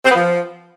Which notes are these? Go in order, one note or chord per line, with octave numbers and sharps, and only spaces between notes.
C4
B3
F3